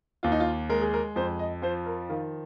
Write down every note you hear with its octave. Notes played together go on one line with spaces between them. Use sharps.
D#2 F4
D#4
F4
G#3 A#4
G#4
A#4
F2 C5
D#5
F3 C5
A#4
D#3 F4